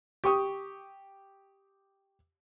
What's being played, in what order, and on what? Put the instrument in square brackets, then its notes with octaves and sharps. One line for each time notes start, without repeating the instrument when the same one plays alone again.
[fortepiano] G4 C#6 D#6